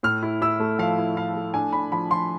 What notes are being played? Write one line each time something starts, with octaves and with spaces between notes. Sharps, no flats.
A2 F6
E4
E4 E6
A3
F3 F5
E4
E4 F5
A3
D4 G#5
D4 B5
F3 B5
F3 C6